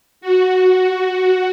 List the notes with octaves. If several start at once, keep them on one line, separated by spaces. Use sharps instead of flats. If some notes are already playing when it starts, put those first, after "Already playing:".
F#4